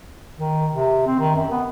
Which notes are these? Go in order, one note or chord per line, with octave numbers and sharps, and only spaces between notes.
D#3
C3
C4
D#3
F#2
B3